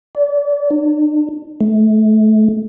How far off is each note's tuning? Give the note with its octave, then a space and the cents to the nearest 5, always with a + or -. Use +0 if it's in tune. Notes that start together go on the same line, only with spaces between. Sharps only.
D5 -35
D4 +45
A3 -25